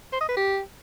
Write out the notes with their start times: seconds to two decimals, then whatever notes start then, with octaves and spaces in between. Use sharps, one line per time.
0.13 C5
0.21 D#5
0.29 B4
0.37 G4